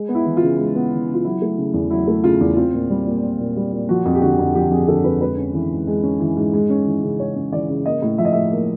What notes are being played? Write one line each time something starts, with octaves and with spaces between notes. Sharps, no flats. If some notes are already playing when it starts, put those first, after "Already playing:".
Already playing: G#3
B3
E4
E3
F4
C#3
G#3
B3
E3
C#3
F4
F#3 E4
A3
C#3
E2
F#3 E4
A3
C#3 F4
E2
C4 F4
A#2
G3
A#2
C4
A#2
G3
A#2
F3 F#4
F2
G4
D3 F#4
F2
F3 G4
F2 G#4
D3 A4
F2 B4
G#3 B4
C#4
E3
G#2
G#3
C#4
E3
G#2
G#3
C#4
E3
C#3
G#3 C#5
C#4
E3 D5
C#3
A#3 D#5
A2
F3 E5
D#5
A2 E5
A#3